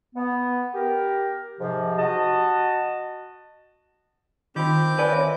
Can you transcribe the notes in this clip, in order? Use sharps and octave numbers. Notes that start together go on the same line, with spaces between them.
B3
G4 A#4
G#2 C3 F3
F#4 D#5 A5
D#3 C4 F4 B5 D6 G6
A#4 B4 D5 G#5
C#5 E5